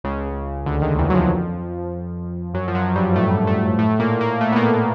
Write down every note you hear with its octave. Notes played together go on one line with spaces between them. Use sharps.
C#2 C#3
D2 D3
D#2 D#3
E2 E3
F#3
F2 F3
F#2 F#3
F3
F#2 F#3
G2 G3
A2 A3
A2 A3
A2 A3
A#2 A#3
A#2 A#3
A2 A3
B3
A#2 A#3